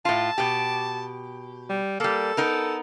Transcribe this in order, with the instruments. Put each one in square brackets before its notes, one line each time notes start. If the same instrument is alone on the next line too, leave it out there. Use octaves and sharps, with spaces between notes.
[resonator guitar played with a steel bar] A2 F4 [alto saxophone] A5
[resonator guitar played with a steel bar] B2 G4
[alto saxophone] G3
[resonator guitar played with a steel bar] G3 A#3 [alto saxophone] A4
[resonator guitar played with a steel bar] B3 D#4 A#4